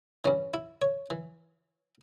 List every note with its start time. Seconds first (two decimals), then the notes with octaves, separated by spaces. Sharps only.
0.24 G2 E3 C#4
0.54 E4
0.82 C#5
1.10 E3